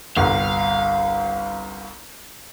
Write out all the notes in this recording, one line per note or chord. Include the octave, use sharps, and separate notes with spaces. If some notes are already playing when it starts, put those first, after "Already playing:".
G1 C2 F5